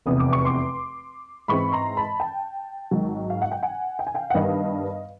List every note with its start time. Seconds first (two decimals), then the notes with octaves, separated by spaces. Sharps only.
0.06 F1 E2 C3 D#6
0.19 D6
0.33 C#6
0.45 C6 D6
1.48 G#2 E3 G#3 C4 B5 C#6
1.72 A#5 C6
1.97 A5 B5
2.20 G5 A5
2.91 G#1 G#2 D#3 F#3
3.30 F5
3.42 F#5
3.52 G5
3.63 F#5 G#5
3.99 G5
4.07 G#5
4.15 F5 G5
4.30 F#5
4.34 G2 D#3 G3 B3 D#5 F5